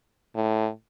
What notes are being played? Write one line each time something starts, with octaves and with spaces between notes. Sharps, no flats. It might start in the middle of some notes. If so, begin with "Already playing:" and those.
A2